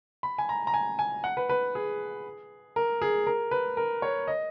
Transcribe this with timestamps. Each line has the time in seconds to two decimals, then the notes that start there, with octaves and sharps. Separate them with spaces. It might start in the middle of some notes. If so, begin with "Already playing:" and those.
0.23 B5
0.38 G#5
0.49 A#5
0.67 A#5
0.74 G#5
0.99 G#5
1.24 F#5
1.37 B4
1.49 B4
1.75 G#4
2.76 A#4
3.02 G#4
3.27 A#4
3.51 B4
3.77 A#4
4.02 C#5
4.28 D#5